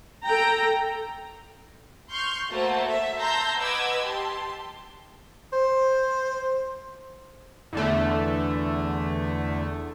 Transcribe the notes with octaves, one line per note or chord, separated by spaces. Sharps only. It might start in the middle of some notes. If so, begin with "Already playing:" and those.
A4 G5 A#5
C6 C#6 F6 G6
A3 A#3 F#4 A4 C5 A5
E5
A5 A#5 C6 E6 G6 A#6
B4 D#5 F#5 D6 E6 G#6
G4 A5 C6
C5
E2 D3 A3